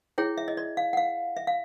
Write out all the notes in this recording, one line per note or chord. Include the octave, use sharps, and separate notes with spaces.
E4 G#4 C#5 G5
E5
D#5
D5
F5
F#5
F5
E5
F5